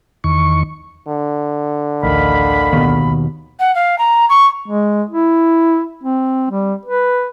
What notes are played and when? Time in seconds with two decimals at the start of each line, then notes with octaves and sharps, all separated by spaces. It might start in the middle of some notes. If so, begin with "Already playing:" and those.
0.24 E2 D#3 C#6
1.08 D3
2.03 A1 D2 D#3 F5 B5
2.73 D#2 B2
3.60 F#5
3.75 F5
3.98 A#5
4.29 C#6
4.67 G#3
5.10 E4
6.04 C4
6.51 G3
6.86 B4